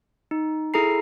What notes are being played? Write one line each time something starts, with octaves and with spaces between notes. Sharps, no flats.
D#4
E4 G#4 A4 A#5 C7